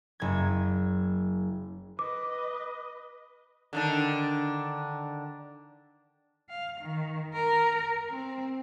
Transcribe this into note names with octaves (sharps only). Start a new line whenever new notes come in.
F#1 G#6
B4 D#5 D6
D3 D#3 D4
F5
D#3
A#4
C4